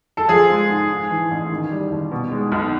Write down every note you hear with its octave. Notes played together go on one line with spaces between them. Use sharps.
A4
F3 G#4
G#3
G#2
G#2
E3
A1
D#3
G3
D#2
B2
G#3
B1